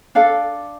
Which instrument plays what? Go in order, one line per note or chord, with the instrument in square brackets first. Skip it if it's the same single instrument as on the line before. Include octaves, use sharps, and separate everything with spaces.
[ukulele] D4 A4 D5 F5